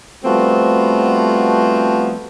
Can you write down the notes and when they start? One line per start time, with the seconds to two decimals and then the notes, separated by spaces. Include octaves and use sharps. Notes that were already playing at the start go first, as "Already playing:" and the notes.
0.24 F3 G3 A3 B3 C4 F#4